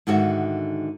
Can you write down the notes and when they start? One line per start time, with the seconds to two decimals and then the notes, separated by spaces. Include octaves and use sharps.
0.07 G#2 D3 D#3 F#4 E5